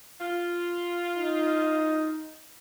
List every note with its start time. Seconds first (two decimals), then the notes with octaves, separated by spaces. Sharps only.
0.20 F4
1.18 D#4